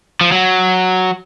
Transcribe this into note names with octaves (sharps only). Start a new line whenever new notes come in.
F3
F#3